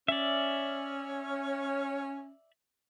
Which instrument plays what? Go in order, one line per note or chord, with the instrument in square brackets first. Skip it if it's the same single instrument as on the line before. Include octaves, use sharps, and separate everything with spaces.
[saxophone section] C#4 [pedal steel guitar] D5 E5